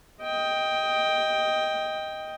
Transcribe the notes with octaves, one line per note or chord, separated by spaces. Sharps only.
D#5 G5